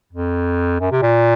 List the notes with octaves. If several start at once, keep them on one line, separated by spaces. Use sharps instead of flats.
F2
F#2
C3
A#2